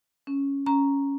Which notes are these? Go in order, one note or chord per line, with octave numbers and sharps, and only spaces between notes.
C#4
C#4 A#5